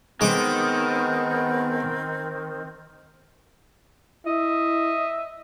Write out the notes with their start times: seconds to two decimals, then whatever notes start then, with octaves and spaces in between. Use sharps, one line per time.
0.21 D#3 G#3 B3 C4 D6
4.26 E4 D#5 E5